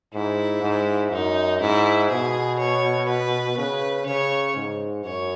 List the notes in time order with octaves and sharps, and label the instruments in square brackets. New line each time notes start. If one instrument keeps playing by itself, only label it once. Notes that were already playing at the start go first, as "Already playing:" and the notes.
[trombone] G#2 [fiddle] E4
[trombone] G#2
[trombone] F#2 [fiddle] D#4
[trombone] G#2 [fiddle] E4
[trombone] B2 [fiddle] G#4
[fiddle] C#5
B4
[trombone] C#3 [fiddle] B4
[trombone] C#3 [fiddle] C#5
[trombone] G#2
[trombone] F#2 [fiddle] C#5